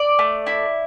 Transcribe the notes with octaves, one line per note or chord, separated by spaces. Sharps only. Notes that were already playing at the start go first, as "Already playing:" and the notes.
Already playing: D5
A3
E4